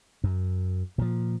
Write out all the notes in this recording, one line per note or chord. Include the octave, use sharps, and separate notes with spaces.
F#2
A#2 F3